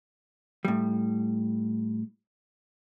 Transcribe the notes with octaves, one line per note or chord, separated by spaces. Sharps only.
A2 G3